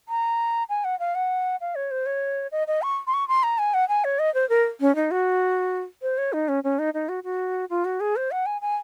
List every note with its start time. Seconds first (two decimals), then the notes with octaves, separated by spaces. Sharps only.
0.09 A#5
0.69 G#5
0.84 F#5
0.99 F5
1.15 F#5
1.61 F5
1.75 C#5
1.91 C5
2.06 C#5
2.52 D#5
2.67 D#5
2.82 C#6
3.07 C6
3.14 C#6
3.28 C6
3.43 A#5
3.58 G#5
3.74 F#5
3.89 G#5
4.04 C#5
4.19 D#5
4.34 C5
4.49 A#4
4.81 C#4
4.95 D#4
5.11 F#4
6.02 C5
6.18 C#5
6.33 D#4
6.48 C#4
6.64 C#4
6.79 D#4
6.94 D#4
7.09 F#4
7.24 F#4
7.70 F4
7.85 F#4
8.00 G#4
8.16 C5
8.31 F#5
8.46 G#5
8.61 G#5